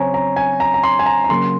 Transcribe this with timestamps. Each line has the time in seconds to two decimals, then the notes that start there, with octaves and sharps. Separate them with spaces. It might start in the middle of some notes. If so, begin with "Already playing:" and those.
Already playing: C#3 F#3 C4 C5 C#5 G#5 A#5
0.14 A#5
0.36 G#5
0.60 A#5
0.74 A#5
0.84 C6
0.99 G#5
1.06 A#5
1.24 A#5
1.29 C#3 F#3 A#3 C6